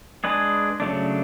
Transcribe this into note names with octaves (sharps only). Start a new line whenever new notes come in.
G#3 D4 G#4 B4
C#3 F#3 A3 D4